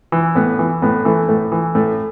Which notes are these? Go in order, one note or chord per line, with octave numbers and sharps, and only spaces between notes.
E3
A2 B3
E3
A2 B3
E3 A3
A2 A3
E3
A2 A3